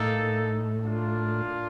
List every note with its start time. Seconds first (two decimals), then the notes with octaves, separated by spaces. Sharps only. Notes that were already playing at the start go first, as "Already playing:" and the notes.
Already playing: A2 A#3 D#4 A4
0.82 A#3 D4 F4